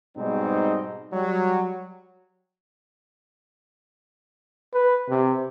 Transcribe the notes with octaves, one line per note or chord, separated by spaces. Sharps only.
G#2 B2 G3 C4 D#4
F#3 G3
B4
C3